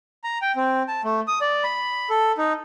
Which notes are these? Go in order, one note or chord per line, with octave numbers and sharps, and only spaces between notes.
A#5
G5
C4
A5
A3
D#6
D5
B5
A4
D#4